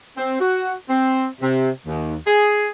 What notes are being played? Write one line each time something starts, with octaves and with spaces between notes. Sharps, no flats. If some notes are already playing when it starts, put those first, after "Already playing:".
C4
F#4
C4
C3
D#2
G#4